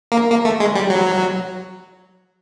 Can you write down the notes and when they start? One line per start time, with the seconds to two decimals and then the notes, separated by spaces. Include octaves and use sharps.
0.12 A#3
0.30 A#3
0.45 A3
0.60 G#3
0.75 G3
0.90 F#3